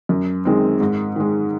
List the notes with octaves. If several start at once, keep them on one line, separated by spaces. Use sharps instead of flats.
F#2
D#3 G#3 C4
G#2
D#3 G#3